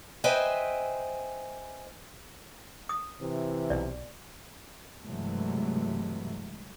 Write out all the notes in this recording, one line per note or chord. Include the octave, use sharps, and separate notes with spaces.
B4 C5 D#5 E5 G5 G#5
D#6
C3 E3
B1 D5
G2 C3 E3 F#3 G#3 A3